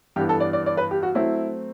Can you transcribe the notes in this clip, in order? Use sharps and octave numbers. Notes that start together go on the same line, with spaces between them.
G2 E3 B3 G4
A4
D5
D5
D5
B4
G4
F#4
F#3 A3 C4 E4